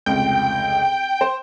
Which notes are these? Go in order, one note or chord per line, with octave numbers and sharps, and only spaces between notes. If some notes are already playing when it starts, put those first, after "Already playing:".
F1 C#2 G5
C5